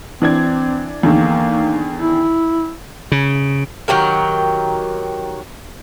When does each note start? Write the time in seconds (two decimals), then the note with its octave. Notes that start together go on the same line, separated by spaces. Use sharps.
0.22 E3 C4 D4 G#6
1.03 E2 D3 D#3 A#3
2.01 E4
3.12 C#3
3.88 D#3 F#3 G4 A#4